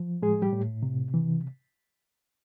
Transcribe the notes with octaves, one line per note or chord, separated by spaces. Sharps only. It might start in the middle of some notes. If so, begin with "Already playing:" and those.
Already playing: F3
A2 G#3 G#4
G3 G4
A2
C3
E3